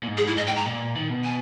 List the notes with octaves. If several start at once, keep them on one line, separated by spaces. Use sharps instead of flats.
A#2
G#2
G#4
G#2
E4
G#2 D#5
G5
G#2
A#5
A#2
D#3
B2
G#5